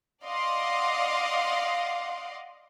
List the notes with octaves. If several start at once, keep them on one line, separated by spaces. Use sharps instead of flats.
D5 D#5 F5 F#5 C6 D6